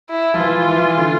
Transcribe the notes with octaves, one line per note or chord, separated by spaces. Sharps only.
E4
F3
E3 F4
E3
D3